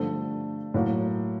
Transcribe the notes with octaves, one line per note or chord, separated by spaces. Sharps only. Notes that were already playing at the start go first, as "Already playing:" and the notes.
Already playing: G2 D3 F3 A3
A2 F#3 A#3